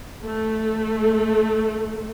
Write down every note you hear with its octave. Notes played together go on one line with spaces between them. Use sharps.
A3